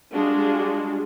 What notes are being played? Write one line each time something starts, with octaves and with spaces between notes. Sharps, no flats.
G3 G#3 D4 F4 F#4 G#4